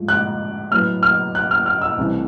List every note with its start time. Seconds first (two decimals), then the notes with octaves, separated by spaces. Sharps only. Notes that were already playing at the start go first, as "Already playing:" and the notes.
Already playing: G#2 F3 A3
0.08 F#6
0.71 A2 F#3 B3 F6
1.03 F6
1.35 F#6
1.51 F6
1.66 F6
1.82 E6
1.98 C2 C3 E3 A3